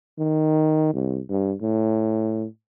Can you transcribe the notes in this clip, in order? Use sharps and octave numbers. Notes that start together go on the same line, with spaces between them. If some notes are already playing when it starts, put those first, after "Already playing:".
D#3
C2
G2
A2